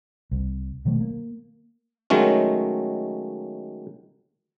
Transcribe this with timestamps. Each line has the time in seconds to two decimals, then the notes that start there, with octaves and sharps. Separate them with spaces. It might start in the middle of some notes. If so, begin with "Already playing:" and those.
0.31 C2
0.85 B2 D#3 F#3 A3
1.01 A#3
2.10 D#3 F#3 G#3 A3 C#4